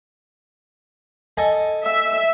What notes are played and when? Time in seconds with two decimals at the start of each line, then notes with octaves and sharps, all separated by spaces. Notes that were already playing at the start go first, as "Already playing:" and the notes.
1.37 A4 D#5 G#5
1.84 E5